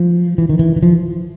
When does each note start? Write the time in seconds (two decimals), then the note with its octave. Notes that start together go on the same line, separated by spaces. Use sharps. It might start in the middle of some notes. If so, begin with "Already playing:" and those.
Already playing: F3
0.38 E3
0.49 D#3
0.59 E3
0.76 E3
0.83 F3